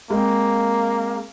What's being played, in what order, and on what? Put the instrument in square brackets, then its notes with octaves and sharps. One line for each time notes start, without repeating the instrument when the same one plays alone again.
[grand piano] G#3 C4 [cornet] A#3